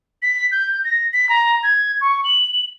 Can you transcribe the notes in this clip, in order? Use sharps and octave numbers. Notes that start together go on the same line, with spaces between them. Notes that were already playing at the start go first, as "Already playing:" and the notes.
B6
G6
A#6
B6
A#5
G#6
C#6
F#7